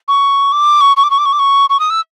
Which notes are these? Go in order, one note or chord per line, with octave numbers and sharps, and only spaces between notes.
C#6
D6
C#6
C#6
D6
C#6
D6
C#6
D6
C#6
C#6
D#6
E6